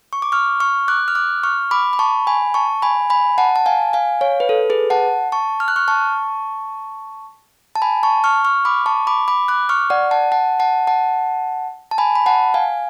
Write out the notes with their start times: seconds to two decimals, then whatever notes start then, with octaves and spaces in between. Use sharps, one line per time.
0.13 C#6
0.22 D6
0.32 C#6 F6
0.60 C#6 F6
0.88 D6 F#6
1.08 F6
1.15 D6 F#6
1.43 C#6 F6
1.71 B5 D6
1.93 B5
1.99 A5 C#6
2.27 G#5 B5
2.54 A5 C#6
2.82 G#5 B5
3.10 G#5 B5
3.38 F#5 A5
3.56 A5
3.66 F5 G#5
3.93 F5 G#5
4.21 C#5 F5
4.40 B4
4.49 A4
4.70 G#4 B4
4.90 F#5 A5
5.32 A5 C#6
5.60 F6
5.68 F#6
5.76 C#6 F6
5.88 A5 C#6
7.75 A5
7.82 G#5 B5
8.03 A5 C#6
8.24 C#6 F6
8.45 C#6 F6
8.65 B5 D6
8.86 A5 C#6
9.07 B5 D6
9.28 B5 D6
9.48 D6 F#6
9.69 C#6 F6
9.90 D5 F#5
10.11 F#5 A5
10.32 F#5 A5
10.60 F#5 A5
10.87 F#5 A5
11.91 A5
11.98 G#5 B5
12.15 B5
12.26 F#5 A5
12.54 F5 G#5